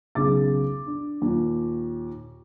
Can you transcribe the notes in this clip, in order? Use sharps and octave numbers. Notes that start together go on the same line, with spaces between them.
B1 C#3 D6 A6
D4
D#2 A#2